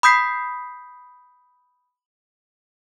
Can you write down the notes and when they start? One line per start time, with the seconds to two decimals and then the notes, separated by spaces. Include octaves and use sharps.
0.03 B5 D#6 G6 B6 C7